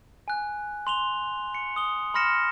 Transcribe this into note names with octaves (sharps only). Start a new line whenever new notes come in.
G#5 F#6
C6 F7 G7
C#7
D#6 G7
B5 C6 F6 A#6 C#7 E7